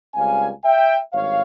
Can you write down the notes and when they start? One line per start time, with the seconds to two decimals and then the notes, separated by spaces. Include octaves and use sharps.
0.15 C#2 C#3 G3 C4 F5 G#5
0.64 E5 G5
1.12 G#1 G2 C#5 F5